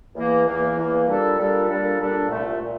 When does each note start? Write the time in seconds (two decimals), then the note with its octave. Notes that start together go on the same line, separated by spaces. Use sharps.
0.15 E2 E3 A#3
0.46 E2 E3 A#3
0.76 E2 E3 A#3
1.07 A#2 G3 D4 A4
1.38 A#2 G3 D4 A4
1.68 A#2 G3 D4 A4
1.99 A#2 G3 D4 A4
2.29 C2 A#2 A3
2.61 A#2